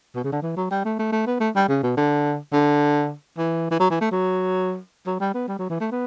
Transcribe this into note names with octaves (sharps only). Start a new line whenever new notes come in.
B2
C#3
D3
E3
F#3
G3
A3
A3
A3
B3
A3
G3
C#3
B2
D3
D3
E3
E3
F#3
E3
A3
F#3
F#3
G3
B3
G3
F#3
E3
A3
B3